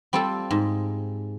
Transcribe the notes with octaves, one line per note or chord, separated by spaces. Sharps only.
G3 C4 F4 A4
G#2